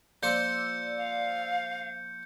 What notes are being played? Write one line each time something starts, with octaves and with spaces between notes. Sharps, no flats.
F3 A#3 C5 D5 E6 G6 C#7
F5